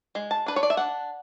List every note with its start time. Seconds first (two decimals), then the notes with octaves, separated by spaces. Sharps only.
0.15 G#3
0.31 A5
0.46 D4 B4
0.56 C#5
0.63 D5
0.70 E5
0.77 D4 F#5